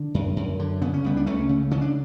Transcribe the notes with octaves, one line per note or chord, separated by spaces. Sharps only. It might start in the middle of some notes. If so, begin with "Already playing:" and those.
Already playing: D3
F#2
F#2
D3
C#3 B3
C#4
C#2 G3 B3
D4
C#2 A3 C#4
C#3
C#3 C#4
D4